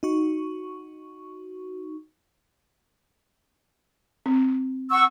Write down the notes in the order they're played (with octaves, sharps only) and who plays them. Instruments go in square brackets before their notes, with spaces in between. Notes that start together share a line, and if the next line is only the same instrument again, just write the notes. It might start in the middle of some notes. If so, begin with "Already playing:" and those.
[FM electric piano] D#4 F#4 C#6
[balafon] C4
[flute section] F#5 C#6 E6